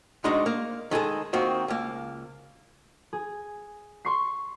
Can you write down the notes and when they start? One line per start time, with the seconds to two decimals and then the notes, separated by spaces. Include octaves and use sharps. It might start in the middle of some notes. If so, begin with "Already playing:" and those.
0.24 G#2 D#3 G#3 D4 D#4 F#4
0.46 A#3
0.91 D#3 G#3 G#4 A4
1.33 D#3 A#3 C4 F4 F#4
1.68 C#2 A#3
3.13 G#4
4.05 C6 C#6 C7